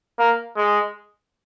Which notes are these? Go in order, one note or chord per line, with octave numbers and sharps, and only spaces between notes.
A#3
G#3